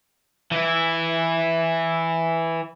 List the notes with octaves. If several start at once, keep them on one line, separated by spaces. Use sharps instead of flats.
E3 E4